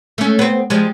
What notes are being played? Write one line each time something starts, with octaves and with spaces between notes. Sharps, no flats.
A3 C#4
B3 C4
F3 G3 G#3